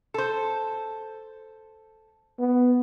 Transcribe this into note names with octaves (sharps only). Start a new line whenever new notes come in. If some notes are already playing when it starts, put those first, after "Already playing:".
A4 C5
B3